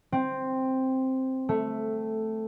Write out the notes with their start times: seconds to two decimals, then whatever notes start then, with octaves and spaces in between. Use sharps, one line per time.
0.12 C4
1.49 A3